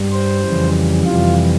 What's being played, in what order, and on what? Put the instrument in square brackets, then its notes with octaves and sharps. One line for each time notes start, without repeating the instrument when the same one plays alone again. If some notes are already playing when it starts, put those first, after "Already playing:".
Already playing: [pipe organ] G2 G3
C5
F2 C#3 E3 G3
F2 C3 E3 G3 F4